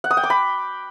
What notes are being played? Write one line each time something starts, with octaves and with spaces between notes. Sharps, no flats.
F#5
D#6
G5
D6
B5